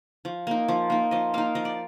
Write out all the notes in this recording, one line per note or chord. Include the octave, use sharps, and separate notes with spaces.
F3
A#3 D#4
F3
A#3 D#4
F3 D#5
A#3 D#4 F5
F3 D#5
D5